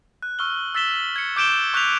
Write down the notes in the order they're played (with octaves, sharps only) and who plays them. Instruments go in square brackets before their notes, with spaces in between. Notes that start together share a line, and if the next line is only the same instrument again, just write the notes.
[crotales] F#6
C#6 E6 F6 G7
E6 A6 B6 E7 G7
G#6 C#7
D6 G6 D7 E7 G7
C#6 F#6 G6 B6 F7